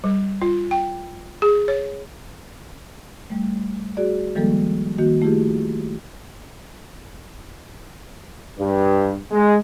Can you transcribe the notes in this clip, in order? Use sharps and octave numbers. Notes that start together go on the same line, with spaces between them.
G3
F4
G5
G#4
C#5
G3 A3
F#4 G#4 D5
D#3 F3 G3 G#3 A#3 A4
D#3 A#3 F#4
A3 E4 F4 G4 G#4
G2
G#3